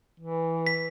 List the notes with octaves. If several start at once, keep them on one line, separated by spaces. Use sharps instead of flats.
E3
B6